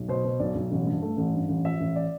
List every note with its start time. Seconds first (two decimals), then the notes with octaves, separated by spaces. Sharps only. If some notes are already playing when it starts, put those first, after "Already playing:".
Already playing: B1
0.08 B2 C5
0.25 B2
0.40 B1 D5
0.55 B1
0.71 A1
0.87 G2
1.02 A3
1.17 A1
1.33 G2
1.49 A1
1.65 F3 E5
1.80 A1
1.96 D5